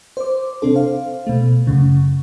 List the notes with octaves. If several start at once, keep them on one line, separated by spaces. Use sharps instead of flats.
C5 D6
C3 C4 D4 A4
C5 F5
B2 A3
F#2 C#3